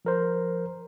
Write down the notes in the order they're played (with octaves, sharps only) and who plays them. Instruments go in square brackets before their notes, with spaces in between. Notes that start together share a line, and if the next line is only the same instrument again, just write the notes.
[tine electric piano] F3 A#4 C5